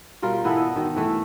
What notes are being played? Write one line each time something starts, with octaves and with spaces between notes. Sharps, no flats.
B2 G3 F4 A#4
E3 B3 E4 A4
D#5
B2 D#3
E3 A3